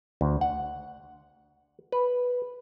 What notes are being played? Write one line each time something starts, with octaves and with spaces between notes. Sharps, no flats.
D2
F#5
B4